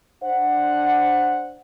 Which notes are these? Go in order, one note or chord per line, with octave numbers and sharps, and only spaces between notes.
D4 C5 F#5